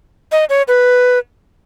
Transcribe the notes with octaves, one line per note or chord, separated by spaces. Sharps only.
D#5
C#5
B4